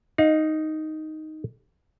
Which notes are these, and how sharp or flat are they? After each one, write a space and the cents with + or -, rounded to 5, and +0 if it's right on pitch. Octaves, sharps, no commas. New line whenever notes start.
D#4 +0 F5 +35